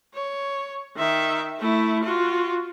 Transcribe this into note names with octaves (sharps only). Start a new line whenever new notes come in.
C#5
D#3 E5
A3 E4
F4 F#4